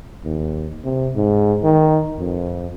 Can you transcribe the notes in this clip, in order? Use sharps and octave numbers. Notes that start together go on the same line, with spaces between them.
D#2
C3
G#2
D#3
F2